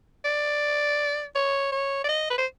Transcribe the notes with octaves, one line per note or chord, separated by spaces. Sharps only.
D5
C#5
C#5
D5
D#5
B4
C5